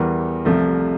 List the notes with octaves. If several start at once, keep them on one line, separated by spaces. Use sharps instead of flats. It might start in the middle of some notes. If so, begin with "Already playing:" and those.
Already playing: E2 E3 G3 A#4
C2 C3 F3 A3